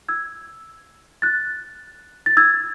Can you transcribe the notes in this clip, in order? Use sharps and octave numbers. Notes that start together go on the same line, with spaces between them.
E6 G#6
F#6 A6
A6
E6 G#6